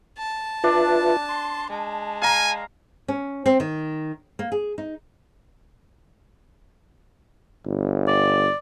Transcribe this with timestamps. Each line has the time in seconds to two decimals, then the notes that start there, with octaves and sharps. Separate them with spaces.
0.18 A5
0.64 D4 F4 B4 D5 E5
1.29 C6
1.70 G#3 A5
2.22 F5 G#5 A#5
3.08 C#4
3.46 C4
3.60 D#3
4.39 A#3
4.52 G#4
4.78 D#4
7.66 G1
8.08 D5